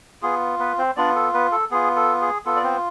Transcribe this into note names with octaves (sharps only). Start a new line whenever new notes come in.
B3 F4 G#4
B3 B4
C4 C5
B3 D4 F4 D5
A4
B3 B4
A4
B3 F4 G#4
A4
G#4
B3 F4 A4
D5
C4 C5